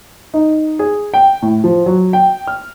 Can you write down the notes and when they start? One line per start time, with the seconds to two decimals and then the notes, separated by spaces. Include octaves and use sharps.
0.34 D#4
0.79 G#4
1.14 G5
1.42 A2
1.64 F3
1.86 F#3
2.13 G5
2.48 F6